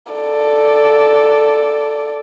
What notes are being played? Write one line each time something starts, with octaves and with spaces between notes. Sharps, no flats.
A4 D5